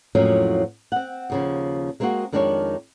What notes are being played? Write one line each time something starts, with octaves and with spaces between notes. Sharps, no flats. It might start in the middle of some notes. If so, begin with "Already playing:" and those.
F2 A2 F3 F#3 A#3 C#4
C4 F#5
D#2 C#3 F3
G#3 A#3 C4 E4 F#4 G#4
F2 D#3 G#3 D4 F4 C#5